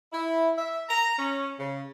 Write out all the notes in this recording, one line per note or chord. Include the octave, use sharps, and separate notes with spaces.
E4
E5
A#5
C#4
C#3